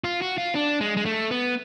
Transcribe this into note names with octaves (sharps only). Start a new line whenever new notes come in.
F4
F#4
F4
D4
G#3
G#3
A3
B3